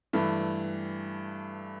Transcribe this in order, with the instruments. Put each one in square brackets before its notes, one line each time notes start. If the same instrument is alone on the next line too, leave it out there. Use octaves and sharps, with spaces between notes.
[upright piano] G2 E3 A3